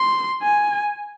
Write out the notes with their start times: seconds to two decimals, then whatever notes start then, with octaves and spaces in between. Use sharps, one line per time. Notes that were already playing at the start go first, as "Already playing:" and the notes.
Already playing: C6
0.42 G#5